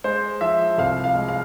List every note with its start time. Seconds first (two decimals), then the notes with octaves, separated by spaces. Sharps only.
0.04 G#3 C5
0.41 F3 E5
0.78 C2 F5
1.04 F5
1.15 G#3
1.29 F5